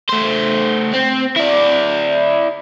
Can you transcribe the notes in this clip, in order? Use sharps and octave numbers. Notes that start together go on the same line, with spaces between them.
A3 C5
C4
E4 D5